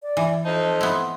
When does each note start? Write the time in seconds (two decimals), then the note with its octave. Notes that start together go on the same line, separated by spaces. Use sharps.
0.03 D5
0.17 E3
0.45 F2 D#4 C5 A5
0.81 B3 E4 C6